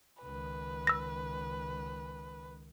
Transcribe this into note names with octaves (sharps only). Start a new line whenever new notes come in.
C#2 D#3 B4
E6 A#6